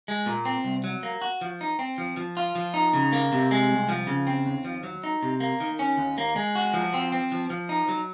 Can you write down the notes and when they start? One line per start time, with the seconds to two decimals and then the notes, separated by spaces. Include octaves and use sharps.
0.08 G#3
0.26 A#2
0.45 C4
0.64 C2
0.84 F#3
1.03 A#3
1.22 F#4
1.41 F3
1.61 D#4
1.79 C4
1.98 F3
2.17 F3
2.37 F4
2.55 F3
2.74 D#4
2.93 C#3
3.12 A#3
3.32 C3
3.51 G#3
3.70 C2
3.89 F3
4.07 C#3
4.27 C4
4.45 D#2
4.65 F3
4.83 F#3
5.04 D#4
5.23 C3
5.40 A#3
5.60 D#3
5.79 C#4
5.98 D#2
6.18 A#3
6.36 G#3
6.55 F#4
6.74 F3
6.94 C4
7.12 C4
7.32 F3
7.50 F3
7.69 D#4
7.89 F#3